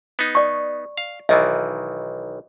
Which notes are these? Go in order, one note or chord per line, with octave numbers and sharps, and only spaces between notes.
B3 D#4
D5 C#6
F5
B1 D#3 E3 D#5 E5